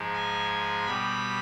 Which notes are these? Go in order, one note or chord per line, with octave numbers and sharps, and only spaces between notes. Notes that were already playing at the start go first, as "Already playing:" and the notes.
Already playing: G#2 F3 G#3
G#5
B2 G3 B5